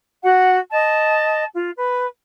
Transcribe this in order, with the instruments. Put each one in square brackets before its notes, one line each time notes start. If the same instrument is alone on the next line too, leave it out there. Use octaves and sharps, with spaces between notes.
[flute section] F#4 F#5
D#5 A5
F4
B4